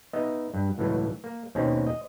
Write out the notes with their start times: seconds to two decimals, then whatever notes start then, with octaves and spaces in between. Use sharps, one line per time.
0.13 B3 D#4 D#5 E5
0.54 G2
0.78 C#2 A2 E3 F#3
1.24 A#3
1.55 D#2 B2 D#3 C4 C#4 D#4
1.87 D#5